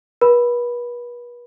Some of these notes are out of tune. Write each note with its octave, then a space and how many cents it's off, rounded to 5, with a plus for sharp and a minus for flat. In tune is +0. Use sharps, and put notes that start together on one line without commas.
B4 -40 B5 +0